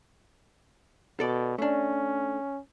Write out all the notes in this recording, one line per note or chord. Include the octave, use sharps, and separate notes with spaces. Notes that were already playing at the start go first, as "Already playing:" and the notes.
B2 A4 D5
A3 C#4 D4